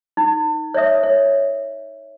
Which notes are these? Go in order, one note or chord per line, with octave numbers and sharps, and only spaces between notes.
D#4
C#5 D5 E5 D#6
C#5